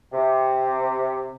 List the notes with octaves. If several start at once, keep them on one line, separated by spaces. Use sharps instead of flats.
C3